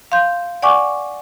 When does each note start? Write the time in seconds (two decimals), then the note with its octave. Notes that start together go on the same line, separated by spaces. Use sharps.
0.12 F5 C6 G6
0.62 D5 F#5 G#5 C#6 D6